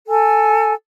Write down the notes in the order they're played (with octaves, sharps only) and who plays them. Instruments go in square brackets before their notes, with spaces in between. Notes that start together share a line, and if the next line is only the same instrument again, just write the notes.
[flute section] A4 G#5